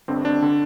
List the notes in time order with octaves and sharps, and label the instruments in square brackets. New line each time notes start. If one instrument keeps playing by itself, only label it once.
[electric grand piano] G1 G2 D3 C4
D4
D3